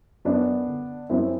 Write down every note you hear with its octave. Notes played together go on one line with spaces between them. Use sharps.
F#2 B3 D4
D3
F#2 C4 E4